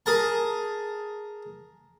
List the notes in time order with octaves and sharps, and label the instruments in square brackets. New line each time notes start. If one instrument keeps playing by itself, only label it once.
[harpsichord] G#4 A#4 A5